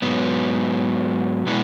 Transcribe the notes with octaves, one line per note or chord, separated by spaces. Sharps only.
G#2 F#3 B3
B2 G#3 B3 E4